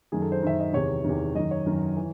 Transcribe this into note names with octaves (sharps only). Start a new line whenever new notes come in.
F#2 D#3 G#4
A4
C5
F#2 D#3 E5
D#5
E2 C3 D#3 C#5
E2 C3 D#3
F#2 D#3 D#5
C#5
F#2 D#3
E3